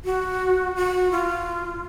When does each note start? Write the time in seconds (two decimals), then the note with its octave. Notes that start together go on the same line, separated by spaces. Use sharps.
0.05 F#4
0.76 F#4
1.11 F4